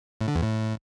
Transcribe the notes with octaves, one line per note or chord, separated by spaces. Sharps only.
A2
D3
E2
A2